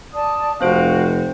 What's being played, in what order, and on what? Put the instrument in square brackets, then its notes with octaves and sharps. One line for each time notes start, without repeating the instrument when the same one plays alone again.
[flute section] D5 A5 D#6
[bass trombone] F1 [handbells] C4 C5 D7 [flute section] F#4 F5